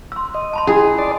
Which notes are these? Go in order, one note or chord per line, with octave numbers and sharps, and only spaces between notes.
C6 E6
D#5
A5 B5 C6
C#4 E4 G#4 B5
D5 A5 C6